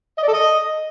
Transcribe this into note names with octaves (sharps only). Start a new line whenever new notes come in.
D#5
D5
A4
D#5